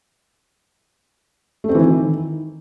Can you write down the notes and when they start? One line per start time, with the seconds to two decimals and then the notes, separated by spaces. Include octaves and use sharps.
1.64 A3
1.69 C4
1.75 E3
1.80 D#3